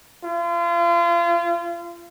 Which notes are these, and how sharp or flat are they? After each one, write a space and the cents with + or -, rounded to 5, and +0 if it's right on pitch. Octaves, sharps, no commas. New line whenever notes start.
F4 -35